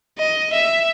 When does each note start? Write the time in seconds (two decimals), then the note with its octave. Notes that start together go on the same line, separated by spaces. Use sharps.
0.18 D#5
0.52 E5